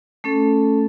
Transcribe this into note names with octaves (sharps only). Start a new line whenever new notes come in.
A3 C#4 A4